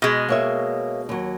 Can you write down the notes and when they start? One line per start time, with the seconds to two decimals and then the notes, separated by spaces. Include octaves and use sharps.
0.02 B2 G#3
0.29 A#3 C#5 E5
1.09 D#2 F#3